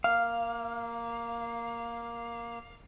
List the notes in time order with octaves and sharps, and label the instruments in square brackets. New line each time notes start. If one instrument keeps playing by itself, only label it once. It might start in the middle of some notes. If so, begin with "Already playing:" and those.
[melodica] A#3 [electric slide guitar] F5